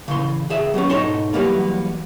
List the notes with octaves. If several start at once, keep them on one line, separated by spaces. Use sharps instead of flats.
C#3 E3 C6
C#2 G#4 E5
F#3 A#3 B3 C#4
G#2 B2 D#4 A4 C#5 C6
E2 F#3 G3 A#3 B3